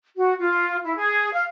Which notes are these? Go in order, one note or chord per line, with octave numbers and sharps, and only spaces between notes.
F#4
F4
E4
G#4
F5